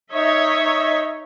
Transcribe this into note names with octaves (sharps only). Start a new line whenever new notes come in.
D#4 C#5 D#5 E5